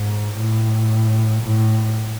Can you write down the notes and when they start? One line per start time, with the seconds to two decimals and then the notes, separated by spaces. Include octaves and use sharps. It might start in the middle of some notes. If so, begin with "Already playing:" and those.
Already playing: G#2
0.37 A2
1.42 A2